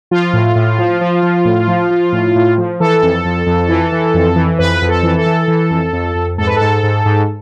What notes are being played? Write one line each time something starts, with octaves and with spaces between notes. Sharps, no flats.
F3 F4
A2
A2
F3
F3
F3
A2
F3
F3
A2
A2
F3
E3 A4
F2
F2
F2
E3
E3
F2
E3
F2 B4
F2
A4
E3
A4
E3
E3
F2
F2
F2
G#2 A4
B4
G#2 A4
G#2
G#2